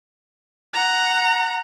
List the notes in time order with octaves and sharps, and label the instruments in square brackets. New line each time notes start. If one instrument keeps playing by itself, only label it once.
[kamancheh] F#5 A#5